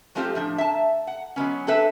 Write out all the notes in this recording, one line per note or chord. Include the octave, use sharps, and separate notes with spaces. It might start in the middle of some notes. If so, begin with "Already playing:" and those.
F3 G#3 A3 C4 F4 G4
A2 F3 D4
E5 A5
F#5
F#3 G#3 B3 C#4
C4 D4 A4 B4 E5